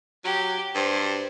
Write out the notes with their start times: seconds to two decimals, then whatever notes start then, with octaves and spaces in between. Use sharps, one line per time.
0.25 F#3 G4
0.75 G2 C5